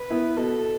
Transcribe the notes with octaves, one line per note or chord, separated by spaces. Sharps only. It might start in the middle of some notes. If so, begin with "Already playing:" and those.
Already playing: B4
B3 E4
B2 A4